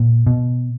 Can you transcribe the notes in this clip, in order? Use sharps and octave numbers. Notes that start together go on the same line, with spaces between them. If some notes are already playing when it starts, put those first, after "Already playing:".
Already playing: A#2
B2